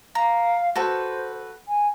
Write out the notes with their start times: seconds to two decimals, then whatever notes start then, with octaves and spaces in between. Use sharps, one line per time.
0.15 F5 A#5
0.75 F#4 A4 B4 C5
1.67 G#5